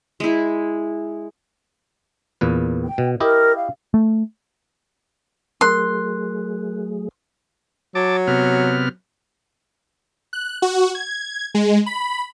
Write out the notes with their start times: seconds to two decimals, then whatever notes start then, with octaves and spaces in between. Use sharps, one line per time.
0.20 G#3 E4
2.41 E2 A#2 B4
2.84 G5
2.98 B2
3.20 E4 G4 A#4 D#5
3.56 F5
3.94 A3
5.61 F#3 A3 G#4 A#4 C6 F#6
7.95 F#3 A5 D6
8.27 C3 B3 F6
10.33 F#6
10.62 F#4
10.95 G#6
11.55 G#3
11.86 B5